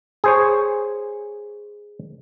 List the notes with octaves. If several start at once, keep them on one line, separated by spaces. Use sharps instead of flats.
G#4 C5 C#5